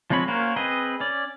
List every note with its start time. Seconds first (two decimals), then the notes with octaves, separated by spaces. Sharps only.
0.10 F3 G#3 C4 C#5 B5
0.28 A#3 C#4 F#4 A#4 C5
0.56 C4 G#4 B4 D#5
1.00 C#4 D5